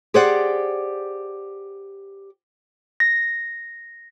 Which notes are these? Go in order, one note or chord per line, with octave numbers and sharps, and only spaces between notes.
G4 G#4 C5 D5 F#5
A#6